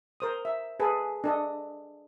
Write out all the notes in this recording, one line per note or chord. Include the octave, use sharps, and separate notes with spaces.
A#4 C5 D#6
E5
G#4 A4 B4
D4 A4 D#5